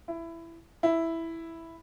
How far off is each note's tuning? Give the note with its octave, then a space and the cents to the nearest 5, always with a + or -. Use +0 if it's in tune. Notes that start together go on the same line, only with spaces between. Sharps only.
E4 +15
E4 +0